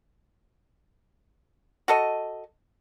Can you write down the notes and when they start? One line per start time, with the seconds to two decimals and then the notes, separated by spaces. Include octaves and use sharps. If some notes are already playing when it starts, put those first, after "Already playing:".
1.88 F#4 A4 D#5